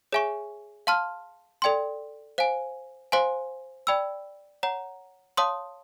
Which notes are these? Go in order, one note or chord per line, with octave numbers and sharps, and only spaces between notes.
G#4 C#5 E5 G#5 C#6
F5 A5 C6 F6
A4 D5 G5 C6
C5 F5 G#5
C5 F5 G#5 C6
D5 G5 B5 E6
C#5 F#5 A#5
C#5 F5 A5 C6 D#6